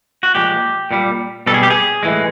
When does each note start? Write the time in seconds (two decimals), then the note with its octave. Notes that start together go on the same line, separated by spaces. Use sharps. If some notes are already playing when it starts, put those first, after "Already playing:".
0.23 F#4
0.35 A#2 F3 G#3 G4
0.91 A#2 G3
1.46 B2 G3 A4
1.54 G#4
1.63 G4
1.70 G#4
2.03 A2 E3 G#3